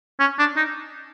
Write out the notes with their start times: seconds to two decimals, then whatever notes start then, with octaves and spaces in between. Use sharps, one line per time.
0.20 C#4
0.39 D4
0.57 D#4